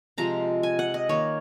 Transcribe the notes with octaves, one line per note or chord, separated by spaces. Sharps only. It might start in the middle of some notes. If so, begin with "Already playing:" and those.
C3 F3 G#3 A#5
G#5
F#5
D#5
D#3 A#3 C#5